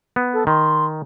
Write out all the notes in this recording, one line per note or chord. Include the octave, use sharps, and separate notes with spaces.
B3
A4
D#3 C6